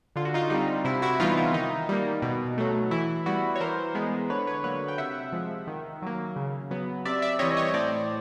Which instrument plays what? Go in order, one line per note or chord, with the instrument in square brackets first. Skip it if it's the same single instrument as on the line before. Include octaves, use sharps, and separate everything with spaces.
[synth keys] D3 F4
F#4
D#4 F4
G3 C4 D#4
C3 E4
E4 F#4
E3 G3 B3 D#4 F4
E4
D#3 D#4
G3 A#3
B2
F#3 A3
E3 E4
G3 B3 E4 F#4
C#5
E3 A#4 C5
G#3 B3
D3 B4 C#5
B4 C#5
F#3 A#3 B4 C#5
G5
C3 E5 F#5
F3 G#3
D#3
F#3 A#3
C#3
F#3 B3
C3 D5 E5
D5 E5
E3 G3 C4 C#5 D#5
C#5 D#5
C#5
A2 C5 D5